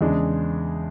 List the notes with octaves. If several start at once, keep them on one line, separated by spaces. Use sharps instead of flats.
E2 C#3 G#3 D4